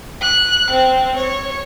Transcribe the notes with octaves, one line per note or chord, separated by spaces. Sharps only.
F#6
C4
C#5